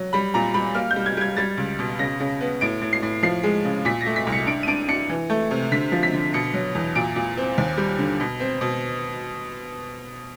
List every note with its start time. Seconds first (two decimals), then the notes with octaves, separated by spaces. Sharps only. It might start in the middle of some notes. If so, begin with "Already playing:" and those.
Already playing: F#3
0.13 G3 B5
0.34 A#2 A#5
0.54 G3 B5
0.75 A#3 F6
0.91 G6
0.96 G3
1.06 G#6
1.17 G3 G#6
1.37 G3 A6
1.57 C#2
1.79 B2
1.99 C#3 A#6
2.20 C#3
2.41 B3
2.61 A2 D7
2.82 A2
2.93 C7
3.03 A2
3.23 F3 C7
3.43 G#3
3.65 C#3
3.85 A#2 B6
4.01 A#6
4.06 A3
4.16 B6
4.27 C2
4.32 C#7
4.47 D4 D7
4.63 D#7
4.67 D4 D7
4.88 D4 C#7
5.09 E3
5.30 A3
5.51 C3
5.72 D3 B6
5.92 F3
6.03 B6
6.13 D3
6.34 B2 C#7
6.54 F#3
6.75 E2
6.95 A#2 D7
7.16 A#2
7.37 C4
7.58 D#2
7.78 G3
7.99 D3
8.20 B2
8.40 C4
8.61 B2